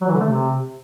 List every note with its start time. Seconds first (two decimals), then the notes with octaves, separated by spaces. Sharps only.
0.02 F#3
0.08 E3
0.14 D3
0.20 A3
0.27 C3